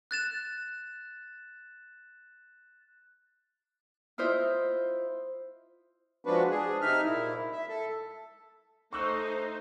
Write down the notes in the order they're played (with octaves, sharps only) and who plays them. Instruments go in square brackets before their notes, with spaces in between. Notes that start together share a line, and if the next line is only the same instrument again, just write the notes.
[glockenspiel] F#6 A6 E7
[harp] E4 F4 C5 D#5 E5
[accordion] F3 G#3 C4 D4 F#4 B4
D4 G#4
C3 D#4 E5 F6
A#2 E4
E5
A4
[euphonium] A3 [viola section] D#4 C5 [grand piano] C#6 E6 F#6